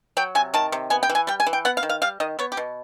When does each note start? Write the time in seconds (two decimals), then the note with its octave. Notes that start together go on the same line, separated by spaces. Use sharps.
0.17 F#3 G5
0.35 C3 G#5
0.54 D#3 A5
0.72 C3
0.90 B3 G#5
1.03 G5
1.09 E3
1.15 G#5
1.27 G3 G5
1.40 G#5
1.46 E3
1.53 G5
1.65 B3 F#5
1.77 F5
1.83 D#3
1.89 F5
2.02 G3 F5
2.20 D#3 D#5
2.39 B3 C#5
2.52 G4
2.57 B2